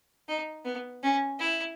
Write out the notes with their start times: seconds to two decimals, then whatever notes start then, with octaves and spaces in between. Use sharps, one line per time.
0.28 D#4
0.65 B3
1.03 C#4
1.39 E4